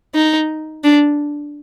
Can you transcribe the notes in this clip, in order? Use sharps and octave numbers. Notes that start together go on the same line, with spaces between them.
D#4
D4